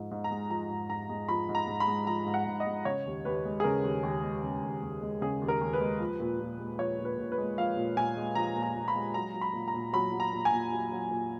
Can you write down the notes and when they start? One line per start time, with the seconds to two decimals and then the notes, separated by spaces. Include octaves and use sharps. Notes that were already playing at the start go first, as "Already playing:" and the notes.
Already playing: G#2 F3
0.11 G#2
0.24 A#5
0.31 G#3
0.49 F3 A#5
0.70 G#2
0.89 G#2 A#5
1.09 G#3
1.28 F3 B5
1.49 G#2
1.55 A#5
1.67 G#2
1.80 B5
1.87 G#3
2.07 F3 A#5
2.26 G#2
2.34 F#5
2.47 G#2
2.60 D#5
2.66 G#3
2.85 C#3 C#5
3.06 D#2
3.25 D#2 B4
3.45 G#3
3.60 G#4
3.64 C#3 A#4
3.84 D#2
4.03 D#2
4.23 G#3
4.43 C#3
4.63 D#2
4.82 D#2
5.03 G#3
5.22 C#3 G#4
5.42 D#2
5.48 A#4
5.61 D#2
5.73 B4
5.81 G#3
6.00 F3
6.20 A#2
6.40 A#2
6.59 G#3
6.78 F3 C#5
6.98 A#2
7.05 B4
7.18 A#2
7.32 B4
7.38 G#3
7.58 F3 F5
7.77 A#2
7.97 A#2 G#5
8.17 G#3
8.35 F3 A#5
8.56 A#2
8.63 A#5
8.75 A#2
8.88 B5
8.95 G#3
9.14 F#3 A#5
9.34 F#3
9.41 B5
9.53 A#2
9.68 A#5
9.74 A#2
9.93 F#3 B5
10.12 F#3
10.20 A#5
10.33 A#2
10.45 G#5
10.52 A#2
10.72 F#3
10.92 F#3
11.11 A#2